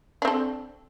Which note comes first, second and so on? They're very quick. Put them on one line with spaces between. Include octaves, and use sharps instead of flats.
D4 C4 A4